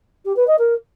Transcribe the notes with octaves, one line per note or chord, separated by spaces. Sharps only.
G4
B4
D#5
A#4